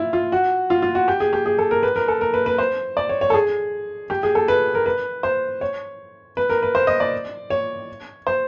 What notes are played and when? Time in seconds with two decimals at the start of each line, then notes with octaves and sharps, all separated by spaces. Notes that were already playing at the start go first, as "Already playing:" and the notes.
Already playing: E4 F4
0.13 F4
0.32 F#4
0.70 F4
0.82 F4
0.95 F#4
1.08 G4
1.20 G#4
1.33 G4
1.46 G#4
1.58 A4
1.71 A#4
1.83 B4
1.96 A#4
2.08 A4
2.21 A#4
2.34 B4
2.46 B4
2.58 C5
2.97 D5
3.09 C#5
3.21 C#5
3.30 A4
3.34 G#4
4.10 G4
4.23 G#4
4.35 A4
4.48 B4
4.75 A#4
4.86 B4
5.23 C5
5.61 C#5
6.37 B4
6.50 A#4
6.63 B4
6.75 C5
6.87 D#5
7.00 D5
7.50 C#5
8.27 C5